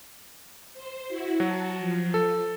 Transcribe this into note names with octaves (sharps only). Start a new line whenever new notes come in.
C5
E4 F#4
F#3 F#4 A5
F3
A4